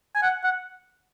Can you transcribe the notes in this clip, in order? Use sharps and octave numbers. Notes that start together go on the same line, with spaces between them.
G#5
F#5
F#5